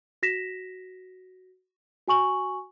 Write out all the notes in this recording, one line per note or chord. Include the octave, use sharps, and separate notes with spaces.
F#4 A#6 B6 E7
F#4 G#5 C#6 F#7